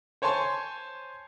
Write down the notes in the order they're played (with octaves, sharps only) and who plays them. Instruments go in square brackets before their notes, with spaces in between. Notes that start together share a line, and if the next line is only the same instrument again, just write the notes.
[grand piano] C5 C#5 G#5 A5 C6